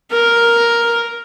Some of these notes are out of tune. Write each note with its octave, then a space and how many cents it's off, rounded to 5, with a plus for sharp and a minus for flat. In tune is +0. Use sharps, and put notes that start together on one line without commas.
A#4 +5